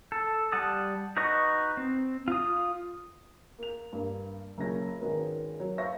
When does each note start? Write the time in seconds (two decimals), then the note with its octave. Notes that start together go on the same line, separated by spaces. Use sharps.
0.12 A4
0.52 G3 F#5 A5 D#6
1.17 D#4 F#4 B4 D#5 C#6
1.77 C4
2.28 F4 D#6
3.59 A#3 F7
3.93 G2 A#3
4.58 F#1 A#2 C#3 C#5 A#6
4.99 G#1 D#3 G#3 C#4 A#4 B4
5.60 F#3 A#3
5.78 B4 C5 E5 F5 C#6 A#6